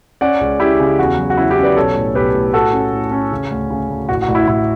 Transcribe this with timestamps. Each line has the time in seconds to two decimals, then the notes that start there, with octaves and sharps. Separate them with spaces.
0.21 C#4 D5 F#5
0.41 C#2
0.60 C#4 E4 G4
0.80 C#3
0.99 E2 F#4
1.18 F#3
1.30 F#4
1.37 C#4 E4
1.51 E4 G4
1.57 C#4
1.63 B4 D5
1.76 B1 A4 C#5
1.96 A2
2.15 B1 G4 B4
2.34 A2
2.53 A2 F#4 A4
2.73 C#4
2.92 A2
3.11 C#4
3.32 C#3
3.51 D2
3.70 C#3
3.90 D2
4.09 A1 F#4
4.22 F#4
4.28 A1
4.35 E4
4.47 A1 E4